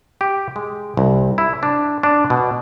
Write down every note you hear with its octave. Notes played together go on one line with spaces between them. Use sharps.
G4
G#3
C2
E4
D4
D4
B2